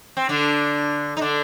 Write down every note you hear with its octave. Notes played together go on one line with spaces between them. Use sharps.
C4
D3 D4
D#4
D3 D4